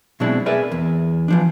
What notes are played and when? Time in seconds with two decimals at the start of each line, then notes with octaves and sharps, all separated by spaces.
0.20 B2 F#3 G#3 C4 D4 E4
0.46 G#4 A#4 B4 D5 E5
0.72 E2
1.28 E3 F3 D4